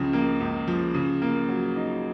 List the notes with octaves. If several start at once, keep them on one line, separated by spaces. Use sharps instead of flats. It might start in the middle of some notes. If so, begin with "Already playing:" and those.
Already playing: C#2 C#3 F3
A#3
C#2
F3
C#3
A#3
F#3
D#4